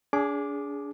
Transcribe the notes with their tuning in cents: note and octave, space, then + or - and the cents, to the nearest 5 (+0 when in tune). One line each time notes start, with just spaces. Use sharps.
D4 -35 G#4 +0 D6 +0